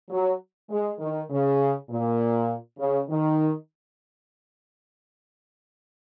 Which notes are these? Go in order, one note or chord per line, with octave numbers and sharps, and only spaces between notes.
F#3
G#3
D#3
C#3
A#2
C#3
D#3